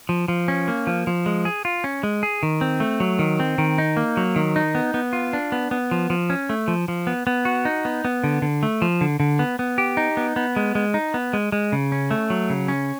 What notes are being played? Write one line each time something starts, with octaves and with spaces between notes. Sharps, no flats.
F3
F3
C#4
A#3
F3
F3
G#3
G#4
F4
C#4
G#3
G#4
D#3
C4
A3
F#3
D#3
C4
D#3
D#4
A#3
F#3
D#3
D#4
B3
B3
F4
D4
B3
B3
F3
F3
C#4
A3
F3
F3
B3
B3
F#4
D#4
B3
B3
D3
D3
A3
F3
D3
D3
B3
B3
G4
D#4
B3
B3
G#3
G#3
D#4
B3
G#3
G#3
C#3
C#4
A3
F#3
C#3
C#4